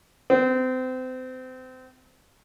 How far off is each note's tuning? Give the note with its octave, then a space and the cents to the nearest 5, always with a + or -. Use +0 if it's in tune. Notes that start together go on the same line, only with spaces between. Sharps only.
C4 -30